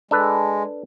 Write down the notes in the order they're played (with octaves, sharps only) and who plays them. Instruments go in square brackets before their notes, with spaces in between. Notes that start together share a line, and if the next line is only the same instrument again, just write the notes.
[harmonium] G#3 [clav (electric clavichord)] D4 A4 B4